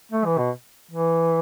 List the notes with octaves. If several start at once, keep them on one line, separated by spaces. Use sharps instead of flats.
A3
E3
B2
E3